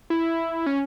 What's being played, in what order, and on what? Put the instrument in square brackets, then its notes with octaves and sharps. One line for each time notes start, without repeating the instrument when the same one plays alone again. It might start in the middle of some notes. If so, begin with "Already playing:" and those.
[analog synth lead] E4
C#4